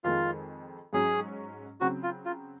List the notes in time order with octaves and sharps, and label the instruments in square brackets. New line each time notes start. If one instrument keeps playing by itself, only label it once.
[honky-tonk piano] F2 D#3 G#3 [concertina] F4
[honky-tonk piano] G#2 F#3 C#4 [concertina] G#4
[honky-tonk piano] C#3 F#3 C4 [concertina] F#4
[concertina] F4
F4